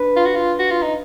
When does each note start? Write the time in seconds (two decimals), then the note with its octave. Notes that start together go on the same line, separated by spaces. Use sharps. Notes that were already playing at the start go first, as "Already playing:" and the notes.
Already playing: D4 B4
0.16 F4
0.26 F#4
0.36 F4
0.59 F#4
0.71 F4
0.82 D#4